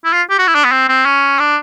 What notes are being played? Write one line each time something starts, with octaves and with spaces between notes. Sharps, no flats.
E4
F4
G4
F#4
E4
D4
B3
C4
C4
C#4
D4